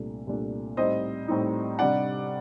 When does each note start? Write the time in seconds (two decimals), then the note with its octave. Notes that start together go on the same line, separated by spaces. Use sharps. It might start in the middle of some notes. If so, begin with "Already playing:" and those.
Already playing: C2 A#2 A3 D4
0.27 C2 A#2 A3 D4
0.77 A2 G3 C4 D#4 C5 D#5
1.28 A2 G3 C4 D#4
1.79 C3 G3 D4 D5 F#5